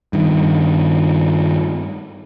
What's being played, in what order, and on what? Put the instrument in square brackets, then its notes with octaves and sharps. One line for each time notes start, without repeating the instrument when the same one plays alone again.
[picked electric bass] G2 D#3